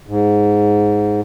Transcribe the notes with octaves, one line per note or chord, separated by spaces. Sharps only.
G#2